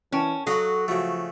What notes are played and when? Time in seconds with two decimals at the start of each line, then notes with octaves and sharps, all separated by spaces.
0.12 E3 C#4 A#4 G5 A5
0.47 F#3 F#4 A4 D#5 F5
0.88 C#3 F3 A3 F#4 F#5